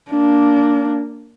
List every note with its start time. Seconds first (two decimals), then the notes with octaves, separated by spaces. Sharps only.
0.11 A#3 D4